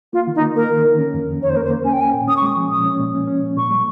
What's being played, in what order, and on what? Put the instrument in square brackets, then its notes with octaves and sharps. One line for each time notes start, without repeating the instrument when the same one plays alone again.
[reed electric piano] A#3 [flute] F4
[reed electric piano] D#3
[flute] D#4
[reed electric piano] A#3
[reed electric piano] A#3 [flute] A#4
[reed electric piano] D#3
D#3
C#4
F2
F2
[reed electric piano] D#3 [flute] C#5
[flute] C5
[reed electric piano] A#3 [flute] A#4
[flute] C5
[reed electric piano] A#3
[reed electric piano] C#4 [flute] G#5
[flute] G5
[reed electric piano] C#4 [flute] G#5
[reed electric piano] A#2
[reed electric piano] C#4 [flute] D#6
[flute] C#6
[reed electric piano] G#3 [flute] D#6
[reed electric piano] F3
[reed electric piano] A#2 [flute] D#6
[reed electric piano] C#4
A#2
C#4
C#4
A#2
[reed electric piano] A#2 [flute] C#6
[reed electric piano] G3